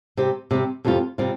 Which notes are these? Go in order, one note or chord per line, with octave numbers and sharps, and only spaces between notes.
C3 G3 C4 G4
C3 G3 C4 G4
F2 C3 G3 C4 F4
C3 G3 C4 F4